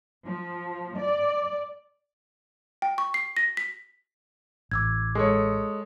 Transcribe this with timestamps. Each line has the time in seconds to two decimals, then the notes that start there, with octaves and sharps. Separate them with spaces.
0.25 F3
0.97 D5
2.82 G5
2.98 C#6
3.14 C7
3.37 A#6
3.57 B6
4.71 A1 D6 E6 G#6
5.15 G#3 A4 C#5 D#6